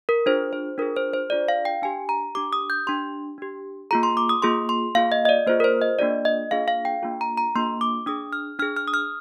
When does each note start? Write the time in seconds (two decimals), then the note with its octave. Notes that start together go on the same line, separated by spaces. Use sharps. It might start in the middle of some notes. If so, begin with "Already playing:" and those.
0.09 A#4
0.26 D4 F4 G#4 C5
0.53 C5
0.78 D4 F4 G#4 A#4
0.96 C5
1.13 C5
1.30 D4 F4 G#4 D5
1.48 F5
1.65 G5
1.82 D4 G4 G#5
2.09 A#5
2.35 D4 G4 D6
2.53 D#6
2.70 G6
2.87 D4 G4 C6
3.38 D4 G4
3.91 A#3 F4 G#4 A#5
4.03 C6
4.17 D6
4.29 D#6
4.42 A#3 F4 G#4 C6
4.69 C6
4.95 A#3 F4 G#4 F5
5.12 D#5
5.25 D#5
5.29 D5
5.47 A#3 F4 G#4 C5
5.60 A#4
5.64 C5
5.82 D#5
5.99 A#3 D4 F4 G#4 D5
6.25 D#5
6.51 A#3 D4 F4 G#4 F5
6.68 F5
6.85 G5
7.02 A#3 D4 F4 G#4
7.21 A#5
7.37 A#5
7.56 A#3 D4 F4 G#4 C6
7.81 D6
8.06 D4 G#4 D#6
8.33 F6
8.59 D4 F6
8.62 G#4
8.76 F6
8.88 D#6
8.94 F6